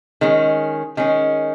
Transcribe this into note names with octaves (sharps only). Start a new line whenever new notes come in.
D#3 G#3 C#4
D#3 G#3 C#4